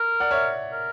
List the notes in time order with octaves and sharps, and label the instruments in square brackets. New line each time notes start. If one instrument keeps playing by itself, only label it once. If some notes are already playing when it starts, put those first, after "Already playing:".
Already playing: [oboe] A#4
[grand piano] D5 F#5
C#5 E5
[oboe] A#4